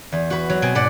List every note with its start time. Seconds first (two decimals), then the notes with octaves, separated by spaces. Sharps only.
0.12 E2
0.30 F#4 B4
0.49 F#3
0.62 B2 C4 G#5
0.75 G#2 B2 D5 F#5